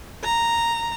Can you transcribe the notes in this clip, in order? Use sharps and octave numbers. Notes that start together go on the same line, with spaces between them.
A#5